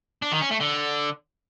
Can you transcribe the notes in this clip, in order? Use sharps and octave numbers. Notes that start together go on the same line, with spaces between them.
D4
D#3
C#4
A3
D3